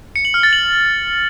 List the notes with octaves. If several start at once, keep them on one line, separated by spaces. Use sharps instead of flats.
C#7
F#7
F6
A6
F#7